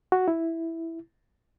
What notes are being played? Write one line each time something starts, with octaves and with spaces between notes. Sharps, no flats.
F#4
E4